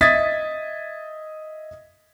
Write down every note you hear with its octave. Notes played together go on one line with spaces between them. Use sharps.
D#5 E5 D#6 G#6 A6 B6